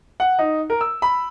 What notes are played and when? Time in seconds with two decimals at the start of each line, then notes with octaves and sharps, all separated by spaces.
0.20 F#5
0.39 D#4
0.70 A#4
0.81 E6
1.02 B5